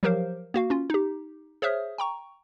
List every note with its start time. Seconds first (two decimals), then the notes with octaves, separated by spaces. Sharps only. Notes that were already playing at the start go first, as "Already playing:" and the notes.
0.03 F3 F#3 G4 A#4 C5 F5
0.54 A#3 F#4 F5
0.70 C#4 F4
0.90 D#4 G4
1.62 G#4 C5 C#5 E5 D#6 F6
1.98 G5 A#5 C#6